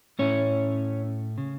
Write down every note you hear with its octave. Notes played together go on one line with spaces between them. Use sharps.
A2 A3 C#4 E4 C#5
C#3